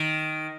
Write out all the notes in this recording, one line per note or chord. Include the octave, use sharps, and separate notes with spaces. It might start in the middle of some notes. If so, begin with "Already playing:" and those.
Already playing: D#3